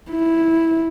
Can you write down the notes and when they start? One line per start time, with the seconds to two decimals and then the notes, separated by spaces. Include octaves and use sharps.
0.11 E4